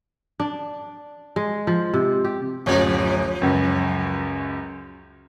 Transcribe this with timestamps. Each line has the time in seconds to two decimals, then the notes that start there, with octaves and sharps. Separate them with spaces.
0.40 D4
1.36 G#3
1.67 F3
1.94 C3
2.24 G4
2.66 D1 F#2 F3 C#5 D5
3.42 C#2 F#2